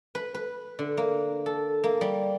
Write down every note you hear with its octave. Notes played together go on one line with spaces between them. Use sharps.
B4
B4
D3
A#3
A4
A#3
G3